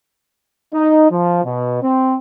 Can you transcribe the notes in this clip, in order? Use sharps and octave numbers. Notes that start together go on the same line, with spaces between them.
D#4
F3
B2
C4